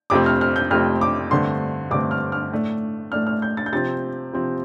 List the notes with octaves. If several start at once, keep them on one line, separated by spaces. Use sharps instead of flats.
F2 C3 A3 C4 D6
F6
F6
G6
F2 C3 A3 C4 F6
D6
G2 D3 A3 C4 C6
G2 D3 A3 C4 D6
F6
F6
A2 A3 D4
A2 A3 D4 F6
F6
G6
A6
G6
C3 F3 C4 A6
C3 F3 C4